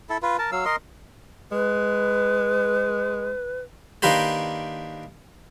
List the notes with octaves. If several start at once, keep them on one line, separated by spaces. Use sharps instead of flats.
E4 A4
F4 B4
A#4 A5
F#3 F5 E6
A#4 D#5 C6
G#3 B4
D#3 A#3 D4 G4 B4 C5